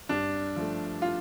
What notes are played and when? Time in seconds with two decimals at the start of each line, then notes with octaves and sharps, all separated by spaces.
0.09 G2 D4
0.56 F3 A3
1.02 F4